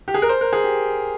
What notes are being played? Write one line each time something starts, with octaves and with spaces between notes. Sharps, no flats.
G4
G#4
A#4
C5
A#4
G#4
G4